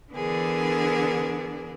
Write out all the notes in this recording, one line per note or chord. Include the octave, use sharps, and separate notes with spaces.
D3 E3 B3 D4 G#4 A#4